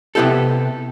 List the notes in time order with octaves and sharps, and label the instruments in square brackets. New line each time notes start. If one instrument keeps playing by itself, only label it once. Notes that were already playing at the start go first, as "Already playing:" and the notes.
[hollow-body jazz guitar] C3 B3 E4 G4 A4